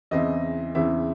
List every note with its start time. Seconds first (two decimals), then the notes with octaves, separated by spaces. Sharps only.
0.11 E2 C#3 E3 C4 E4 D#5
0.75 E2 C#3 E3 C4 E4 E5